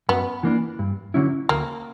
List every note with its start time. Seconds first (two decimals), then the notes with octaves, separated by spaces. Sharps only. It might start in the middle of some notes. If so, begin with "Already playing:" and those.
0.09 F#2 B3
0.43 E3 A#3 D4
0.79 G2
1.14 D3 F#3 C#4 E4
1.49 D2 A#3